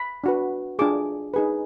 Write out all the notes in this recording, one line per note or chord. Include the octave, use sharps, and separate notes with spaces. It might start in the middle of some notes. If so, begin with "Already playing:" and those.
Already playing: B5
D4 F#4 B4
D4 F4 G#4 D6
D#4 G#4 B4